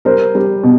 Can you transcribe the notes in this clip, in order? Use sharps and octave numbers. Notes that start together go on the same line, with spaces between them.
G3 A#4 C5
G3
B2